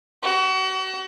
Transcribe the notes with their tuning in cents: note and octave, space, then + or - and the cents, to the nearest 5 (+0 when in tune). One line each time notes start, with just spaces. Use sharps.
F#4 +35